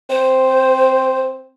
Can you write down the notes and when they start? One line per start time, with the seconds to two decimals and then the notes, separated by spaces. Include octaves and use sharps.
0.10 C4 C5